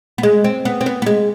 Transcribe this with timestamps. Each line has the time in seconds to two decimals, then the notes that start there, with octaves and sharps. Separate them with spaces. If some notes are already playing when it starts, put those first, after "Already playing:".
0.18 B3
0.23 G#3
0.44 C4
0.65 B3
0.81 C4
0.86 B3
1.02 B3
1.06 G#3